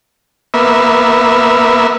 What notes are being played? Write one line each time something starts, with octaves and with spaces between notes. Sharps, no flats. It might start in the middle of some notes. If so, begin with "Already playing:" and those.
A#3 B3 E5